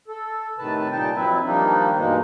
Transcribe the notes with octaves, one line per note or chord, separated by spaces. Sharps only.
A4
A2 C3 D#3 B4 A5
A#2 G3 D#4 G5 A5
F2 F#3 C4 E4 B4 E5
D#3 F3 G3 A#3 D4 D#4
G2 B2 E3 G#3 A#3 D#4